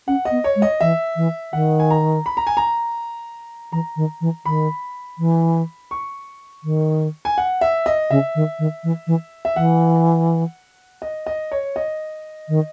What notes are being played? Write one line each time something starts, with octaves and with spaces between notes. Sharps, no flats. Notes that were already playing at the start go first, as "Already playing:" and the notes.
C#4 F#5
D#5
B3
C#5
G#3
D#5
E3 E5
E3
D#3 F#5
G#5
A#5
B5
A#5
G#5
A#5
E3 A#5
D#3
E3
D#3 B5
E3
C#6
D#3
G#5
F#5
E5
D#5
C#3 E5
D#3
D#3
E3
E3
E5
E3 F#5
D#5
D#5
C#5
D#5
D#3